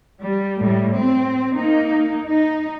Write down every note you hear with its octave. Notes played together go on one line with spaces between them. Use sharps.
G3
A2 G3
C4
A#3 D#4
D#4